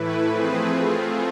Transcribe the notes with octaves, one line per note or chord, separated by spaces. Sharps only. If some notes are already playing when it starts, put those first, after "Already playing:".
Already playing: A2 E3 A3 E4 B4
F3 A3 C4 G#4 B4
A3 C4 F4 G#4